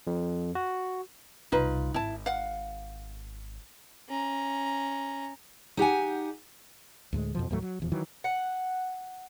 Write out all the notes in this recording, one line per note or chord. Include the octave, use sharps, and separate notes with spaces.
F2
F#4
E1 C2 D#4 F4 B4
G#1 E4 A5
F5 F#5
C#4 A#5
D#4 G4 F#5 G#5
D2 A2 G#3
F2 B2 F3
D#2 A2 F#3 A3
F#3
D#1 E2 F3
D#3 E3 F#3
F#5